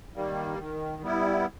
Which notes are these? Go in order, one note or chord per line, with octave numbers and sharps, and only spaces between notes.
D#3 G3 A#3
D#3
G3 B3 E4